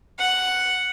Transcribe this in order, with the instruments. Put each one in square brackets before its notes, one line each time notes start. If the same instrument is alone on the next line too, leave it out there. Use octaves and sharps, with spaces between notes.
[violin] F#5